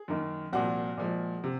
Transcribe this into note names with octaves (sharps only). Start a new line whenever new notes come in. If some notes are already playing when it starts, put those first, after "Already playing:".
Already playing: G#4
F#2 D#3 A#3
C2 A#2 F3 F#4
A#2 F3 G#3
C3